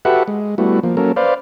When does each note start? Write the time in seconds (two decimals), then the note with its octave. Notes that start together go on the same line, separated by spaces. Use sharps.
0.05 F#4 G4 A4 B4 E5 F#5
0.28 G#3
0.58 G3 A3 B3 E4 F#4
0.83 F3 A#3
0.97 F#3 A#3 C#4 A4 A#4
1.16 B4 C5 D5 F5